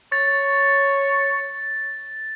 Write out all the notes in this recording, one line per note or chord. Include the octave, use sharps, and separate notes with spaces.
C#5 A6